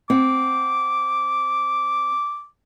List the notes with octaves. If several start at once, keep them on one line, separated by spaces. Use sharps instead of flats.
C4 F#5 D6